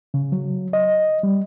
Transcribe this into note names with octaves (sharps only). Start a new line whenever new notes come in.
C#3
F#3
D#5
G3